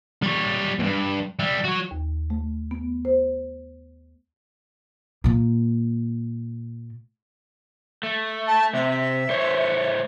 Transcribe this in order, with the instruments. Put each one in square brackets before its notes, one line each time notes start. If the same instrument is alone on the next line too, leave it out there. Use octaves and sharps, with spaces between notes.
[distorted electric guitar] G3 C#5
E2 G2
G3 E4
F#4 C#5
[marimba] D#2
A3
B3
C5
[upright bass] A#2 A#3
[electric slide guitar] A3
[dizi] A5
[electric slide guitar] C3 [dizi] E5
[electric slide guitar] A2 C5 C#5